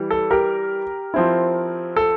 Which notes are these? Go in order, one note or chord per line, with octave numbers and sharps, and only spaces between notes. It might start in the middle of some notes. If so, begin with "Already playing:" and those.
Already playing: E3 G3
A4
G4 A#4
F3 C4 E4
A4